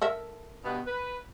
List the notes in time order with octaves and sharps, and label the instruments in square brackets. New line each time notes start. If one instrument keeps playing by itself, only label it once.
[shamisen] A4 A#4 E5
[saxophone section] G2 B2 B3
B4